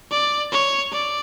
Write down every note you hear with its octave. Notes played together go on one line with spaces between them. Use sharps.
D5
C#5
D5